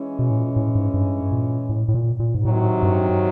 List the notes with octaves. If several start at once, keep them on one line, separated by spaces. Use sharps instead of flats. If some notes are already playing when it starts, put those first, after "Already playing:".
Already playing: E3 G#3 C#4
B2
A2
A#2
A2
G#2
G2
A#2
A2
A2
A#2
A#2
G#2
A2 C3 D#3 F#3
G2